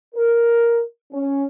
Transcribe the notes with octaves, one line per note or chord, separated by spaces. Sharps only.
A#4
C#4